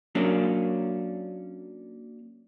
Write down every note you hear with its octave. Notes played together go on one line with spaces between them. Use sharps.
F#3 A#3 C#4 D4